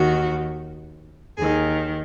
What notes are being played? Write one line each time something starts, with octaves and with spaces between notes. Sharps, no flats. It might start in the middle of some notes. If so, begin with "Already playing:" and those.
Already playing: D#2 D#3 F#4
D#2 D#3 G#4